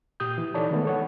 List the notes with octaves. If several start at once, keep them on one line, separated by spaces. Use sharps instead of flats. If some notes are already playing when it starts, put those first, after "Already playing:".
A#2 G4 D#6 G6
E3
D#4 A4 C#5 D5 A5
D#3 E3 G#3 A3 B3
A4 C#5 F#5